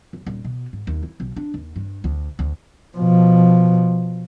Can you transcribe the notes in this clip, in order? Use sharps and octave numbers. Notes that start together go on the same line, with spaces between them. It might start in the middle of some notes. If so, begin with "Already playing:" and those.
F#1
D#1
B2
G#2
D#2
E4
B1
D4
D#2
G2
D2
D2
B2 F3